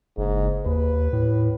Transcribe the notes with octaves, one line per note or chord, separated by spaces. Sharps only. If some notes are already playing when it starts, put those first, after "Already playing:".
F#1 G#2
D#2 B4
A2